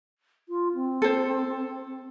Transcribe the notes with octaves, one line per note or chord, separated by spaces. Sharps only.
F4
C4
A4 C5